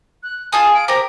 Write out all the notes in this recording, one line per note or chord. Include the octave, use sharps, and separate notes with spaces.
F#6
F4 G#4 G#5 A5 D#6
D7
G4 A#4 C5 A#5